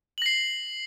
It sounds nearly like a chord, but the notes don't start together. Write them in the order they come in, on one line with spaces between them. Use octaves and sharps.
F#7 A#6 C7